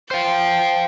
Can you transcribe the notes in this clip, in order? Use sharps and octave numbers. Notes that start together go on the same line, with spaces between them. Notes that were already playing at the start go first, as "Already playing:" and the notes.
C5 F5 G5